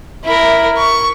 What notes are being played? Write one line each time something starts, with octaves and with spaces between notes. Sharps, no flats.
E4 A#4
C#6